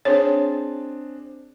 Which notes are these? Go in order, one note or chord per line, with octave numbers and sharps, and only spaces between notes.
C4 D4 G#4 C#5